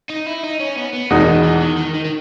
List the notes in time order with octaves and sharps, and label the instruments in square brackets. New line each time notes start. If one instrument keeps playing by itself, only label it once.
[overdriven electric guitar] D#4
E4
D#4
C#4
B3
B3
[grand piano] E2 B2 G#3 B3 D#4 [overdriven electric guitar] A#3
[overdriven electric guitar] D#3
E3
D#3
D#3
D#3
D#3